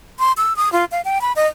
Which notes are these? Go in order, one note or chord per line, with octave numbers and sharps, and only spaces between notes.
C6
E6
D#6
F4
F5
G5
B5
D#5